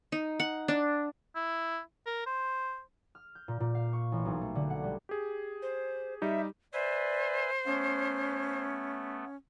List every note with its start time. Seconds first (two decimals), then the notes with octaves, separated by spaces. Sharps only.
0.12 D#4
0.40 F#5
0.68 D4
1.35 E4
2.06 A#4
2.26 C5
3.15 F6
3.35 G6
3.48 A#2
3.60 A#2
3.75 F5
3.93 C#6
4.12 A1
4.25 B1
4.41 A3
4.55 D3
4.70 F#5
4.83 G3
5.09 G4 G#4
5.62 C5
6.22 G3 D#4 G4 E5
6.73 B4 C5 D5 E5 G#5
7.65 A3 B3 C#4